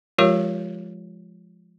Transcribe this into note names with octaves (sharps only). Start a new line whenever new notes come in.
F3 G#3 F4 G4 A#4 C#5